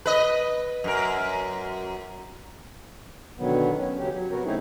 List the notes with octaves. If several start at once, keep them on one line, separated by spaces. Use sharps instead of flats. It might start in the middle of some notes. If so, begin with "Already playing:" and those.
B4 D#5
F#2 A#4
B2 D3 D#3 F#3 B3
C#4
C#3 F#3 G4
F#3
C3 B3 F#4 A#4
A3 C4 C#4 D#4 E4 G#4